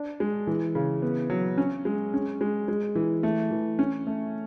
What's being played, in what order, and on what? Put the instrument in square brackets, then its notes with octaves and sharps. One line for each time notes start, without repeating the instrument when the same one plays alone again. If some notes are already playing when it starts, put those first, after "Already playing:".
Already playing: [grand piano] D4
G#3
E3
C#3
B3
F#3
C#4
G#3
C#4
G#3
G#3
E3
A3
E3
C#4
A3